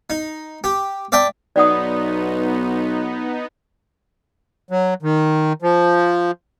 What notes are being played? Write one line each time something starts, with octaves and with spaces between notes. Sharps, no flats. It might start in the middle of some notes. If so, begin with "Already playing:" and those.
D#4
G4
D5 E5 G5 A5
B1 B3 D#4 D5 F#5 D#6
F#3
D#3
F3